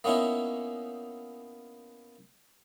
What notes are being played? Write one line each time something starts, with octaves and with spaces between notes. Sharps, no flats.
A#3 B3 C#4 D#4 E4